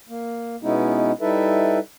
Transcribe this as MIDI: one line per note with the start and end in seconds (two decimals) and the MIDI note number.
0.09 0.56 58
0.63 1.12 47
0.63 1.12 56
0.63 1.12 59
0.63 1.12 61
0.63 1.12 63
0.63 1.12 64
1.21 1.79 55
1.21 1.79 63
1.21 1.79 64
1.21 1.79 69
1.21 1.79 71
1.21 1.79 76